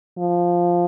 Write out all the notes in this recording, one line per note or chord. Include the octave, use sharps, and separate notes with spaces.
F3